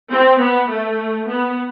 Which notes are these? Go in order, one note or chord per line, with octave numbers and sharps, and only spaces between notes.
C4
B3
A3
B3